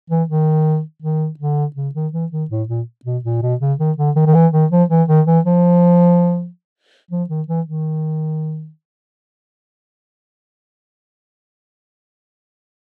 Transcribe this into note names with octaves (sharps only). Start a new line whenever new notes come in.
E3
D#3
D#3
D3
C#3
D#3
E3
D#3
A2
A#2
B2
A#2
B2
C#3
D#3
D3
D#3
D#3
E3
D#3
F3
E3
D#3
E3
F3
F3
D#3
E3
D#3